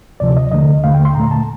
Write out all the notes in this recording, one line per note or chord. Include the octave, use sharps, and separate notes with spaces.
D2 C3 F3 D5
D#5
D#2 D3 A3 D#5
D#2 D3 A3 F5
G5
C6
A#2 A3 A#5
A5